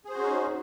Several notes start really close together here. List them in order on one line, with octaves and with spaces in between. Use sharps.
G#4 C5 F#4 C#4 D#4